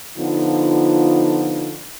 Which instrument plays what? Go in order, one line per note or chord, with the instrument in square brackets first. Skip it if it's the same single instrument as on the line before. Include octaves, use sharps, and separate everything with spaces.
[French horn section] D3 F3 B3 D#4 F4